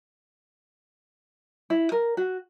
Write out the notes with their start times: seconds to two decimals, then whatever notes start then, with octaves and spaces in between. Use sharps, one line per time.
1.70 E4
1.92 A#4
2.17 F#4